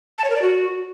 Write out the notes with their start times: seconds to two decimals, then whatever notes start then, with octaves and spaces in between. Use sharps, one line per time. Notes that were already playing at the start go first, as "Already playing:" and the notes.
0.18 A5
0.24 C#5
0.30 A#4
0.36 D5
0.42 F#4